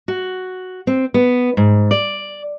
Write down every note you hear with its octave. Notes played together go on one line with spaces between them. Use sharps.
F#4
C4
B3
G#2
D5